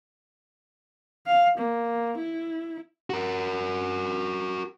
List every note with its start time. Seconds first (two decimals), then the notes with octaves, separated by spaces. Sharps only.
1.27 F5
1.58 A#3
2.17 E4
3.10 F#4 A#4